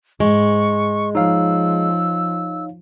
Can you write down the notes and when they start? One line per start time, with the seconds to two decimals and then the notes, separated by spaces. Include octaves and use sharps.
0.20 G#2 G#3 C#6
1.15 F3 D#4 C#5 F5 E6